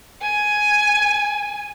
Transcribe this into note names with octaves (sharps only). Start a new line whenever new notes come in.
G#5